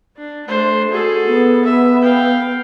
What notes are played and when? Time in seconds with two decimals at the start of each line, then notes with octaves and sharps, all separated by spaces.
0.17 D4
0.47 A3 D4 C5
0.91 F#4 G#4 A4
1.27 B3
1.64 E5
2.02 F5 G5